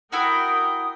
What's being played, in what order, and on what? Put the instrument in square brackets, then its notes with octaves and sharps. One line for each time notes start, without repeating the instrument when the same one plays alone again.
[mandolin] E4 F#4 [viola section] A#4 G5 [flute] D#6